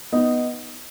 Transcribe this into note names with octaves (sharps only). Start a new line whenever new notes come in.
B3 D#4